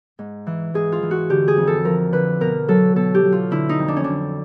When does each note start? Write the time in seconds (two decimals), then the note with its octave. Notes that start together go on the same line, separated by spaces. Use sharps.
0.19 G#2
0.47 E3
0.74 G#2 G#4
0.92 F4
1.03 E3
1.11 F#4
1.29 D3 G4
1.48 G#4
1.57 F2
1.67 A4
1.85 F3 A#4
2.12 D3 B4
2.40 B2 A#4
2.68 F#3 A4
2.96 B2 A4
3.14 G4
3.24 F#3
3.32 F4
3.51 D3 E4
3.69 D#4
3.79 F2
3.88 D4
3.96 C#4
4.04 D3 D4